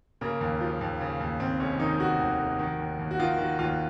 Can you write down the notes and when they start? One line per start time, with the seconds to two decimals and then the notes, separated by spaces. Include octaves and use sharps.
0.21 C#3 A#3
0.41 D#2
0.61 F3
0.81 D#2
1.01 C#3
1.21 D#2
1.40 D#2 C4
1.60 F1 C#4
1.80 D#3 D#4
2.00 F1 F#4
2.20 D#2
2.39 F1
2.59 D#3
2.79 D#2
2.99 D#2
3.11 F#4
3.19 D#3 F4
3.38 D#3 F#4
3.59 D#2 F4